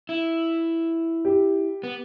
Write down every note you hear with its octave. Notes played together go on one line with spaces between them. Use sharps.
E4
G4
B3